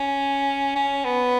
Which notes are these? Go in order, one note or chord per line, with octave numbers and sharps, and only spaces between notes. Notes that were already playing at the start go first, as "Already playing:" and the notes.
Already playing: C#4
C#4
B3